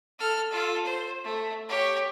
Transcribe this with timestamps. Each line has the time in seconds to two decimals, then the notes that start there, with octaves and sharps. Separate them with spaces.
0.19 A4 F6
0.51 F4 A4
0.85 C5
1.23 A3
1.68 G4 C#5